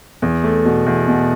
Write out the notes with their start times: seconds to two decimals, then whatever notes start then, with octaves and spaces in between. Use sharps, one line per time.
0.22 E2
0.44 A3
0.65 B2
0.86 E2
1.08 B2